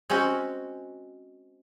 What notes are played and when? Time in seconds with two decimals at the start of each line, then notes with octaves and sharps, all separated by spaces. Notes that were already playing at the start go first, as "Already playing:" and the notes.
0.10 G#3 C4 C#4 F#4